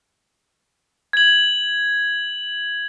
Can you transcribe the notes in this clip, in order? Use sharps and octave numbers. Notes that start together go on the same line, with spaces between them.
G#6 F#7